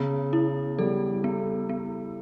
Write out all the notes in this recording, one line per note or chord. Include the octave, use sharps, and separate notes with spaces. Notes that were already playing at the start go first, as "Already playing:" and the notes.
Already playing: C#3 B3
E4
G3 A4
B3
B3